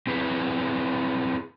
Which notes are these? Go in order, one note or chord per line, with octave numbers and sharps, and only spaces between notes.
C4 E4 G#4 B4